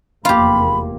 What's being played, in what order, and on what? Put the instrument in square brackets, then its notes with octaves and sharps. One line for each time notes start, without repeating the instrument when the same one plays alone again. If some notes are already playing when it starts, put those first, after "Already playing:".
[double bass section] F1 E2 A#3 [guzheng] F4 G4 [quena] B5